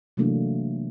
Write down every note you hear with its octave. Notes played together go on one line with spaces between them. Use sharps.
C3 E3 F#3 A3 A#3 D4